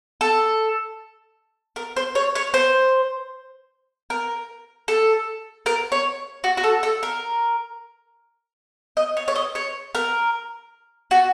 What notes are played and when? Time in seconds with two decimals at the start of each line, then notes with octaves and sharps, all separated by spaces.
0.21 A4
1.76 A#4
1.96 C5
2.15 C#5
2.35 C#5
2.54 C5
4.10 A#4
4.88 A4
5.66 A#4
5.92 C#5
6.44 F#4
6.57 F#4
6.64 A4
6.83 A4
7.03 A#4
8.97 D#5
9.17 C#5
9.28 C#5
9.36 D#5
9.55 C#5
9.95 A#4
11.11 F#4